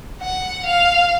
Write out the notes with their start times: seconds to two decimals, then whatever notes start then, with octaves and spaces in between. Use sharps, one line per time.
0.21 F#5
0.65 F5